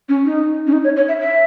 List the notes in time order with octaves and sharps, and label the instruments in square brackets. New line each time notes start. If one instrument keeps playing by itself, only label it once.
[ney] C#4
D#4
C#4
D#4
C#5
C#5
E5
E5